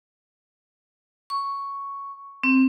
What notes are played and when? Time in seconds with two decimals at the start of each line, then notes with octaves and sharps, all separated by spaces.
1.30 C#6
2.44 C4